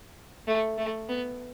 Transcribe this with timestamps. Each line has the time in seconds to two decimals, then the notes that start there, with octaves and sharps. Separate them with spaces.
0.47 A3
0.78 A3
1.09 B3